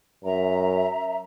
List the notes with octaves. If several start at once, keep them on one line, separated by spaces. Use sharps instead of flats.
F#2 E5 A#5